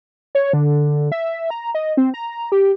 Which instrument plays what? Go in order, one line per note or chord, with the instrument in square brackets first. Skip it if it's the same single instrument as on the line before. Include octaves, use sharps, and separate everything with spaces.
[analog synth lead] C#5
D3
E5
A#5
D#5
C4
A#5
G4